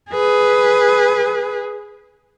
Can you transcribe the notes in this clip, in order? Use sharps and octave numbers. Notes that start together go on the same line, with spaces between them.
G#4 B4